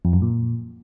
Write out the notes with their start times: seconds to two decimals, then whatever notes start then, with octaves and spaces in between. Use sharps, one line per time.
0.05 F2
0.13 F#2
0.22 A#2